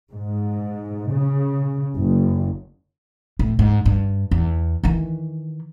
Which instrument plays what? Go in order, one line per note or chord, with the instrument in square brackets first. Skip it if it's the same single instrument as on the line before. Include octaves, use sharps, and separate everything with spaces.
[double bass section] G#2
C#3
F#1
[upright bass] A2
G#2
G2
E2
D#3 E3